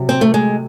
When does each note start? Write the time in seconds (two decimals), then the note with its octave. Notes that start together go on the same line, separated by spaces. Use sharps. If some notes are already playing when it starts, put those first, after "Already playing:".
Already playing: C3 F#3
0.09 C4
0.21 A3
0.34 G#3